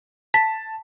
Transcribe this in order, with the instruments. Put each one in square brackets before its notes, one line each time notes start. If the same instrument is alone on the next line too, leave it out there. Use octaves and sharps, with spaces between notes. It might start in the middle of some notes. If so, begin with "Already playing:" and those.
[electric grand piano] A5 [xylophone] B6